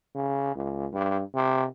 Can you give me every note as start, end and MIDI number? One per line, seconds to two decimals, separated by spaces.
0.15 0.53 49
0.55 0.87 37
0.93 1.21 43
1.35 1.65 48